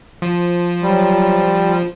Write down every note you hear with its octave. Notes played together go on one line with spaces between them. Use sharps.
F3
F#3 G3